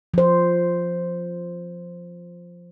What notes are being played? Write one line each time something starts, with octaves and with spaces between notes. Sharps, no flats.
F3 C5